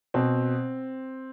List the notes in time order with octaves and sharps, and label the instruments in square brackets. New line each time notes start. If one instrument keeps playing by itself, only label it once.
[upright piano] B2 C4